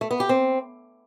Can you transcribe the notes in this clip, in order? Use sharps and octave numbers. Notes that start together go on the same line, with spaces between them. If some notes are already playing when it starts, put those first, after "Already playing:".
A3
B3
G4
C4